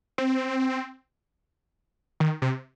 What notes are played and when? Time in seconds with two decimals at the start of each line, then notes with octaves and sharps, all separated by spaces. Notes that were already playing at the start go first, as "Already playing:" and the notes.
0.18 C4
2.20 D#3
2.42 C3